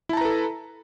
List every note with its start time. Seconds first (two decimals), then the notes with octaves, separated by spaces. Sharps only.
0.09 E4
0.13 A5
0.17 A#5
0.21 B4
0.25 A4